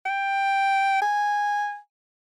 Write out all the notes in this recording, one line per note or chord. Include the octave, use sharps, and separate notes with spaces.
G5
G#5